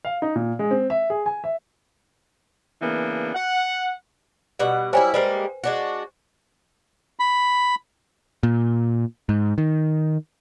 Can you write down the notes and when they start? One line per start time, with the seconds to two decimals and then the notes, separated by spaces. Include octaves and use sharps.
0.05 F5
0.22 D#4
0.36 A#2
0.59 G#3
0.71 C4
0.90 E5
1.10 G#4
1.26 G#5
1.44 E5
2.82 C#3 E3 A#3 B3 D4
3.35 F#5
4.59 B2 G3 F#5
4.93 F#3 G3 E4 C5 G5 G#5
5.14 G3 G#3 A#3 B4 C5
5.64 G#3 D4 F#4
7.19 B5
8.43 A#2
9.29 G#2
9.58 D#3